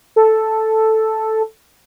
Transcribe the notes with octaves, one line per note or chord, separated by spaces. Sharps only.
A4